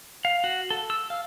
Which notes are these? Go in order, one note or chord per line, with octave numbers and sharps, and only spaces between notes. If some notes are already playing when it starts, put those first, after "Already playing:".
F5
F#4
A4
E6
F5